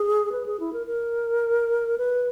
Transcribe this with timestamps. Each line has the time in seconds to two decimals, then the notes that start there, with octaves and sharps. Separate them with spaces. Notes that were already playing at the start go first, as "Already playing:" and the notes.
Already playing: G#4
0.32 B4
0.46 G#4
0.60 E4
0.73 A#4
0.87 A#4
1.98 B4